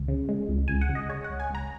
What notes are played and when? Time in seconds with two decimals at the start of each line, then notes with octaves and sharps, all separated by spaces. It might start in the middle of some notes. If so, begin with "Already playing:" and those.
Already playing: C#2
0.08 C#3
0.29 G#3
0.49 C#2
0.68 C#2 G#5
0.81 F#5
0.89 C#3
0.95 D#5
1.09 G#3 C#5
1.24 F#5
1.30 C#2
1.40 G#5
1.50 C#2 A#5